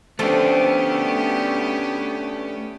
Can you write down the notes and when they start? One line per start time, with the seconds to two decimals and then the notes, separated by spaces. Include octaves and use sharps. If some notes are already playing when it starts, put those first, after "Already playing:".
0.19 F3 A3 B3 C#4 D4 G4 A4 C6